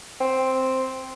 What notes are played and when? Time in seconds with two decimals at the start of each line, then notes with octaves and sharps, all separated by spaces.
0.21 C4